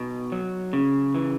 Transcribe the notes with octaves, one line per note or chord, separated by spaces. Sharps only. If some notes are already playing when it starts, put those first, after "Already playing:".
Already playing: B2 D#4
F#3
C#3
E3